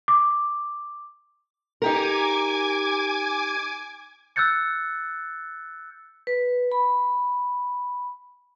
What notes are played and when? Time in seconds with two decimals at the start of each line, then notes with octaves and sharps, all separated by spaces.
0.08 D6
1.82 D#4 G4 A#4 G#5 D6 G#6
4.36 E6 F#6 G6 A6 C#7
6.27 B4
6.72 B5